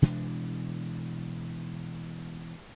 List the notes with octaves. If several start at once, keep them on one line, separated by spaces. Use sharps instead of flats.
B2 E3 G#3 D4